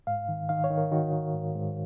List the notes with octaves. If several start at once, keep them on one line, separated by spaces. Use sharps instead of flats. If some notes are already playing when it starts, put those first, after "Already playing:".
G#2 F5
D#3
D#3 F5
C#5
D#3
A#4
D#3 F#4
D#3
G#2
G#2